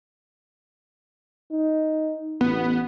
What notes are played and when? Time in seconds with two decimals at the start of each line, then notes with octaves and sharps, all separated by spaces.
1.51 D#4
2.41 A1 B3